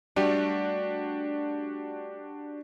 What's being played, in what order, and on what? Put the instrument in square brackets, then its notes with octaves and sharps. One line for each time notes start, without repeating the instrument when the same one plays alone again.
[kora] G3 A3 [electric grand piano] D4 F#4 G4